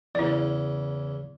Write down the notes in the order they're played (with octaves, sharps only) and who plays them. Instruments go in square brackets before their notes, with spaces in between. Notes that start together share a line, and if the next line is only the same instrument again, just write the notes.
[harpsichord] E2 C#3 [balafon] E4 D5